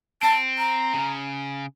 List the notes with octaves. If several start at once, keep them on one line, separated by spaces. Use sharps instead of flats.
C4 A5
A#5
C#3